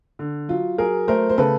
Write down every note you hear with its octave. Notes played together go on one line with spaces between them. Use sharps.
D3
F#3 F4
F#3 G#4 A#4
A3 A#4 C5
C5
C#3 A4 B4